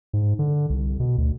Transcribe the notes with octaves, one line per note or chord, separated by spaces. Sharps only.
G#2
D3
C2
B2
D2